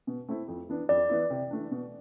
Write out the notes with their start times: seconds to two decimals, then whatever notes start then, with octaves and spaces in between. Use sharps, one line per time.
0.07 B2
0.28 A3 C4 E4
0.48 F2
0.69 E3 B3 D4
0.89 F2 D5
1.09 E3 B3 E4
1.30 C3
1.50 E3 A3 D4
1.71 B2